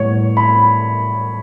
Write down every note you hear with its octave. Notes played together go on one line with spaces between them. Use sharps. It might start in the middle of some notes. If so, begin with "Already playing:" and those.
Already playing: A2 G3 B3 C#5
B5